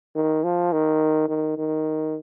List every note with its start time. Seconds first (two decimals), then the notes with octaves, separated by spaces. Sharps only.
0.15 D#3
0.44 F3
0.73 D#3
1.29 D#3
1.58 D#3